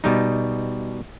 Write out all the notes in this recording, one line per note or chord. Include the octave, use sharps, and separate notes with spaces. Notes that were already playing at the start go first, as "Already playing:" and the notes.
B2 G3 D#4